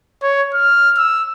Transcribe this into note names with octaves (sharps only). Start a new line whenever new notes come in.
C#5
F6
E6